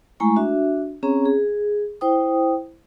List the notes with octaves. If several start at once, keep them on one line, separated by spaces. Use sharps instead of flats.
G#3 A3 E4 G#5 A#5 C#6
D4 F#4 E5
C4 C#4 G#4 C#5 A#5
G#4
E4 C5 G5 D#6